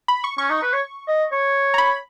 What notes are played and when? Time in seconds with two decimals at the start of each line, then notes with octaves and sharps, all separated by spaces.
0.08 B5
0.24 C#6
0.38 C#4 C#6
0.50 D#4
0.62 B4
0.73 C#5
1.08 D#5
1.32 C#5
1.74 A#5
1.78 B5